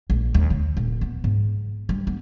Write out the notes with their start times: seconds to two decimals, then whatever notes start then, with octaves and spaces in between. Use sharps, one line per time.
0.10 A#1
0.34 D#2
0.50 D3
0.77 D#1
1.01 B3
1.24 G#2
1.89 G3
2.07 B3